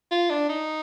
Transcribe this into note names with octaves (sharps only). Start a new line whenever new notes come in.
F4
D4
D#4